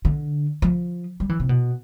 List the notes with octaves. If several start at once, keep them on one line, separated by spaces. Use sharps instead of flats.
D3
F3
G3
E3
C3
B2